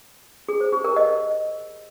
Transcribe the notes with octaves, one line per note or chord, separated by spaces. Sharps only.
G#4
C5
G4
A#4
D#5